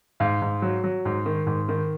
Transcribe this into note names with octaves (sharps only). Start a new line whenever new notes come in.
G#2 F5
G#2
F#3
F#3
G#2
D#3
G#2
D#3